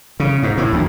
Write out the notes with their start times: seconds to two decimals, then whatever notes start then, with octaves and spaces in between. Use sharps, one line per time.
0.20 C#3
0.43 G#2
0.58 A2
0.73 D2